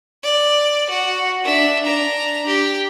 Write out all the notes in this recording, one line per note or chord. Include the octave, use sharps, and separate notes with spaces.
D5
F#4
D4 E5
D4 A#5
G4